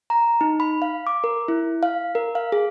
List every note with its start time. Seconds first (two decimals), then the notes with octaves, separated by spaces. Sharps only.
0.10 A#5
0.41 D#4
0.60 B5
0.82 F5
1.07 D6
1.24 A#4
1.48 E4
1.83 F5
2.15 A#4
2.35 F5
2.52 G#4